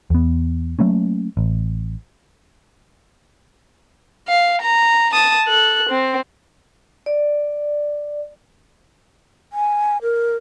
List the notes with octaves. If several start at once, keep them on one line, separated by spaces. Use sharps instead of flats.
E2 B3
F#3 A3 A#3 C#4
A1
F5
A#5
A5 D#6
A4 F#6
C4
D5
G#5
A#4